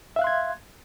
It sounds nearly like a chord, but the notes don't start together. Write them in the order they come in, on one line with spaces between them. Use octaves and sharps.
E5 F5 F#6 C6 G#6